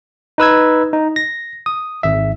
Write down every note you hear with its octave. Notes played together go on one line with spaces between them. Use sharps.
D#4 B4 E6 G#6
D#4
A#6
D#6
G#1 E5